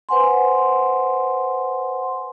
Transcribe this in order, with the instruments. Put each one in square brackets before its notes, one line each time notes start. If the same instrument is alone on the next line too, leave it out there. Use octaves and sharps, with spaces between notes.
[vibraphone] B4 C5 F#5 G#5 C6